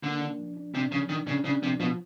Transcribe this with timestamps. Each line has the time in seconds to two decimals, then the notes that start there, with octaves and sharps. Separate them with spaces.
0.03 D3 A#3
0.21 D4
0.39 F3
0.57 D4
0.74 C3 D4
0.92 C#3 F3
1.09 D#3 D4
1.27 C#3 D4
1.45 C#3 D4
1.62 C3 F3
1.80 B2 F3